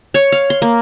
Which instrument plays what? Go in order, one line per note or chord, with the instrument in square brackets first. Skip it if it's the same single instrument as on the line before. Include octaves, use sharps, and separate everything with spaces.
[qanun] C#5
F5
C6
A#3